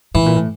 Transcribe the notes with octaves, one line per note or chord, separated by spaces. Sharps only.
A2 E3
A#2
A2